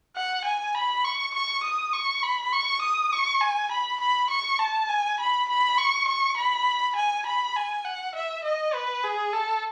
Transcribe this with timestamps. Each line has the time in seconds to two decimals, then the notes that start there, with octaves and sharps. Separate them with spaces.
0.16 F#5
0.44 G#5
0.74 B5
1.04 C#6
1.34 C#6
1.63 D#6
1.93 C#6
2.23 B5
2.52 C#6
2.82 D#6
3.12 C#6
3.40 G#5
3.71 B5
4.00 B5
4.30 C#6
4.59 A5
4.89 G#5
5.19 B5
5.49 B5
5.78 C#6
6.07 C#6
6.37 B5
6.96 G#5
7.26 B5
7.56 G#5
7.84 F#5
8.15 E5
8.44 D#5
8.74 B4
9.03 G#4
9.32 A4